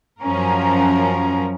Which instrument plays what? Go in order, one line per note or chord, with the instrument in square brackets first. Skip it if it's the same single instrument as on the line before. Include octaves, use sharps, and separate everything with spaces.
[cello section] F#2 F3 C#4 A#4